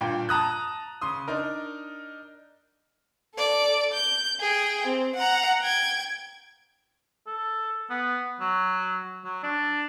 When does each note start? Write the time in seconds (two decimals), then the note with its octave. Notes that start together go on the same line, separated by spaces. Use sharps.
0.01 G2 A#2 G5
0.29 A5 A#5 D#6 F#6
1.01 C#3 C6 D#6
1.28 D4 D#4 A#4
3.35 A4 D5
3.93 G6
4.40 G#4 G5
4.87 C4
5.15 F#5 A#5
5.62 G5 G#6
7.27 A4
7.90 B3
8.40 F#3
9.25 F#3
9.43 D4